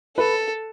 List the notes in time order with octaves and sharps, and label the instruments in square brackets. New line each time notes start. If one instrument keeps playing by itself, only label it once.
[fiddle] A4 [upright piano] B4